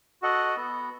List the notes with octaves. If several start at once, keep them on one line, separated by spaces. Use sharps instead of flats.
F#4 A4 D#5 F#5
B3